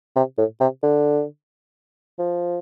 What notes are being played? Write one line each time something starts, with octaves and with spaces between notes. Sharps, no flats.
C3
A2
C3
D3
F3